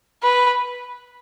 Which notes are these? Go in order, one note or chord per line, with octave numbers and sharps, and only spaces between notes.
B4